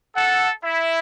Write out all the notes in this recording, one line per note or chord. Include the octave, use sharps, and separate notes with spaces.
A4 F#5
E4 E5